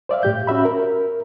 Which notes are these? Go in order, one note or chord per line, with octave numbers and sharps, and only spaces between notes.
C5 D5 E5 F5
A2 G4 G6
C#4 F#4 E5 B5
A#4